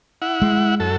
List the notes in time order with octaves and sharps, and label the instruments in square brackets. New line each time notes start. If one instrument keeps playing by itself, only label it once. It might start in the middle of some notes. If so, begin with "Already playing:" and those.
[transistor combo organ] E4 F#5
[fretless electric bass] G#3
[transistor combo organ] F#2 A4